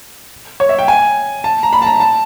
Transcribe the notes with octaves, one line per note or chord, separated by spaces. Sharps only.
C#5
E5
G5
G#5
A5
A#5
B5
A5
A#5
A5